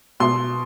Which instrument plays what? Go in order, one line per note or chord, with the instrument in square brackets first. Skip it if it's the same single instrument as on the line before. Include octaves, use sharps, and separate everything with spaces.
[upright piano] B2 C6